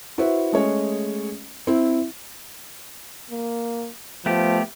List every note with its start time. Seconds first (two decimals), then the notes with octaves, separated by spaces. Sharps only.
0.18 E4 F#4 B4 C5 E5
0.53 G#3 A3 C#4 G#4 C#5 D#5
1.67 C4 E4
3.31 A#3
4.26 F3 A3 B3 G4